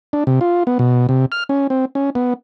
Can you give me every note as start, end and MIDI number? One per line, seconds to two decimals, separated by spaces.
0.13 0.24 62
0.27 0.39 48
0.41 0.63 65
0.67 0.78 59
0.79 1.07 47
1.09 1.26 48
1.32 1.44 89
1.49 1.67 61
1.70 1.85 60
1.95 2.10 61
2.15 2.34 59